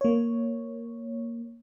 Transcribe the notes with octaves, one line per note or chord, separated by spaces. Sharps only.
A#3 C#5